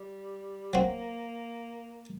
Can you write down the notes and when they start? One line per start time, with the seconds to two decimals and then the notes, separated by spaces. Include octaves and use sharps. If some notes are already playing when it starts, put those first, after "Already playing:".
Already playing: G3
0.73 F#3 A#3 C4 F#4